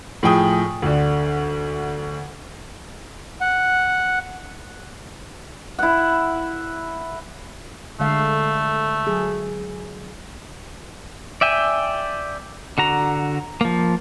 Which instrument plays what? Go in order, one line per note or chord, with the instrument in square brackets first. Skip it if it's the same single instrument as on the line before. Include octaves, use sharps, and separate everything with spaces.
[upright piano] A2 F3 G#4 G5 D#6
D2 D3
[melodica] F#5
[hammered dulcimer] E4 F#5
[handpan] D3 G#3 F5 [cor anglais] A3
[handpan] F#3 G#4
[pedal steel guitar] D5 E5 G5 G#5
D3 F#4 A#5
F3 A#3